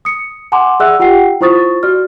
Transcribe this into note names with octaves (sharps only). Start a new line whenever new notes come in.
D#6 C#7
F#5 G#5 A#5 C6 D6
G#4 D5 E5 F#5 E6 F#6
F4 G4 F#5 G5 C7
E4 F4 C5 C#6 D#6 A6
F#4 D5 F6